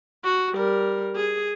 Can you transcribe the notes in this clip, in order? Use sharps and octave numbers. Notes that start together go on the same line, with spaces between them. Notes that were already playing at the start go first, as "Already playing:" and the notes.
F#4
G3 A#4
G#4